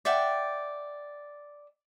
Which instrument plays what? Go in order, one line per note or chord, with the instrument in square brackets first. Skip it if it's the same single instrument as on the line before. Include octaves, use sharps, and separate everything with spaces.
[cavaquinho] D5 E5 F#5 G5